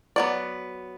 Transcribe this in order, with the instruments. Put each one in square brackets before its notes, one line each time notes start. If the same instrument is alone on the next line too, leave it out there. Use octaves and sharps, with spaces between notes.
[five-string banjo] F#3 B3 D5